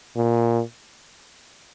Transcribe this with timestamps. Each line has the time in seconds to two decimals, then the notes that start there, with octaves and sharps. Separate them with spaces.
0.16 A#2